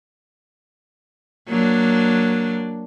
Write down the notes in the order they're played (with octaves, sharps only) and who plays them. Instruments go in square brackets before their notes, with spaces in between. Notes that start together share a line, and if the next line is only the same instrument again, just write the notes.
[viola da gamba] F#3 A#3 D4